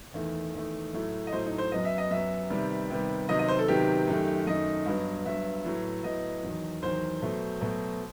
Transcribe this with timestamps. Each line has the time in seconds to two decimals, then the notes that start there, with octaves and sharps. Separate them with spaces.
0.14 E2 D#3 A3
0.54 E2 D#3 A3
0.93 A2 F#3 A3
1.27 D#5
1.32 A2 F#3 A3 C5
1.46 D#4
1.58 C5
1.72 F#2 F#3 B3 D#5
1.85 E5
1.98 D#5
2.11 F#2 F#3 B3 E5
2.50 C3 D#3 G3 B3
2.90 C3 D#3 G3 B3
3.29 C3 D#3 F#3 B3 D#5
3.39 D#5
3.48 C5
3.59 A4
3.68 C3 D#3 F#3 B3 G4
4.08 F#2 D#3 A3
4.47 F#2 D#3 A3 D#5
4.86 G2 F#3 B3
5.25 G2 F#3 B3 E5
5.65 A2 F#3 B3
6.04 A2 F#3 B3 D#5
6.43 E2 D#3 F#3
6.82 E2 D#3 F#3 C5
7.22 B2 F#3 A3
7.61 B2 F#3 A3